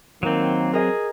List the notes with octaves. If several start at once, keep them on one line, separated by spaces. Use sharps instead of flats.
D#3 F#3 A#3 C4
G#4 A#4 D#5